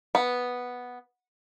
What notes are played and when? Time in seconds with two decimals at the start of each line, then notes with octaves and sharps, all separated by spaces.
0.15 B3